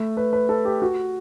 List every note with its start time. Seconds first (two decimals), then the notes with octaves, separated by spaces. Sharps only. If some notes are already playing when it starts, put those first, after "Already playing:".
Already playing: A3
0.17 B4
0.33 B4
0.49 A4
0.65 G4
0.82 F#4